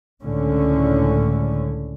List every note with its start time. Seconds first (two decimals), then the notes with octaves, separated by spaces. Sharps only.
0.23 C#2 A2 D3 C#4